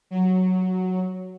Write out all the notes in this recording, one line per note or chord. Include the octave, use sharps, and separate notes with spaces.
F#3